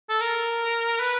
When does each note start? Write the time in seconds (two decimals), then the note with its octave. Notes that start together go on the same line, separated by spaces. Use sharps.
0.09 A4
0.21 A#4
1.00 B4